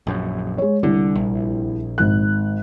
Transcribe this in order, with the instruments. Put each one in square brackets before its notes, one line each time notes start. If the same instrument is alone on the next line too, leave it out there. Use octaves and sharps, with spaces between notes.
[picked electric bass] A#1 F#2
[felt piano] G#3 C#5
[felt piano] C2 [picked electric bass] D3
[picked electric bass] A#1
[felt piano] G#1 F#6